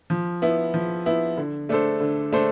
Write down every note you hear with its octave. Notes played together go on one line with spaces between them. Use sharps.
F3
B3 E4
F3
B3 E4
D3
A3 D4 A4 C5
D3
A3 D4 A4 C5